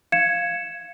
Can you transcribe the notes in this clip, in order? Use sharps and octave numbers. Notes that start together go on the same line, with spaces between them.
F5 G#6 C#7 E7